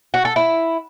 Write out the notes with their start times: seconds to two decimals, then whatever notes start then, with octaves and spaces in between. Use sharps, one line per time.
0.14 F#4
0.25 A4
0.36 E4